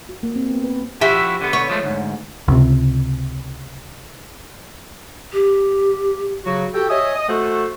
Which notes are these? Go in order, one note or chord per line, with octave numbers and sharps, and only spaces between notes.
F#4
A#3
C4
B3
B4
F3 E4 F#4 G4 E5
D3 B3
C#5
F3 G#3 A3
D2 G#2
C#2 C3
G4
C#3 F#3 F#4
F#4 G4 A4 G5
C#5 D#5 E5 G#5 D#6
D#5 D#6
A3 F#4 A4 C5 F#5